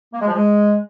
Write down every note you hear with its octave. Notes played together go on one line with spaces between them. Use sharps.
A#3
G#3
F3
G#3